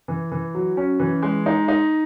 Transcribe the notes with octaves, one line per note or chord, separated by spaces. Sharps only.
E3
E3
F#3
C#4
E3
G#3
D#4
D#4